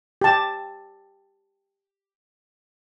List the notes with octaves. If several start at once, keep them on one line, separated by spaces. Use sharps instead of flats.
G4 A5